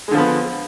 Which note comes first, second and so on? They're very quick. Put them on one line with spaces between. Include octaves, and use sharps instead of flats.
G#3 D3 F3 B3